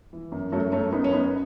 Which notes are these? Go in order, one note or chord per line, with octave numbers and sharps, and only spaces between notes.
E3
F#2
F#2 F#3 A3
F#2 A3 C#4
F#2 B3 D#4
C#4
F#2 B3 D#4